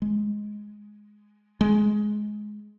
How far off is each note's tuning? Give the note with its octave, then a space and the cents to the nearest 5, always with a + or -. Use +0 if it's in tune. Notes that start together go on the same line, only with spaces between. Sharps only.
G#3 +5
G#3 +15